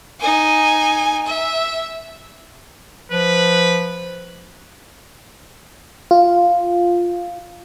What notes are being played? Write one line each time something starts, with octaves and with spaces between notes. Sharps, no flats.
D#4 G#5
E5
F3 B4
F4